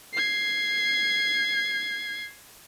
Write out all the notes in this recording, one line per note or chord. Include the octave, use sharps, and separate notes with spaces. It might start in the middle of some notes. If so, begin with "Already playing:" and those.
G#6 C7